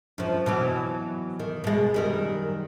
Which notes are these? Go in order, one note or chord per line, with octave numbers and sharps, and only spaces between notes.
F#2 F3
B2 E3 F#3
D#3
B2 G#3
F#2 D#3 G3